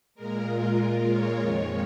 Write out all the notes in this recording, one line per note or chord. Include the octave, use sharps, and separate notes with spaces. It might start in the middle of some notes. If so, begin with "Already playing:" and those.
A#2 G#3 A#4
F4
A#4
C#5
F2 D#3 G#3